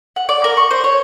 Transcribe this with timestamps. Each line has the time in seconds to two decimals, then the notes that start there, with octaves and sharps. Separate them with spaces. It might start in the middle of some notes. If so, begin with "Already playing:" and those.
0.16 F#5
0.29 D5
0.44 A#4
0.57 C#6
0.71 C5
0.84 C#5